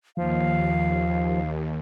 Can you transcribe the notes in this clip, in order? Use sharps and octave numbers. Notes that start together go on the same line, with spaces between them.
D#2 F3 F5